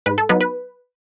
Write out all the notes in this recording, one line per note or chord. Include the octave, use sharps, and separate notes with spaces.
G#2 B4
A4
F#3 B3 D#4 B4
B4